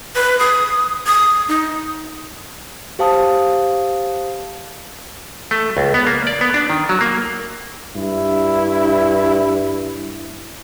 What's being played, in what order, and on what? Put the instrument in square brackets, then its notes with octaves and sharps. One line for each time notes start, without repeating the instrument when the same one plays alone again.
[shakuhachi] B4
D#6
D#6
D#4
[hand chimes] G4 C5 F5 A5 D#6
[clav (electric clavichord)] A3
C#2
B3
A#3
D5
B3
D4
D#3
F#3
A#3
[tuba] G2 [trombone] E4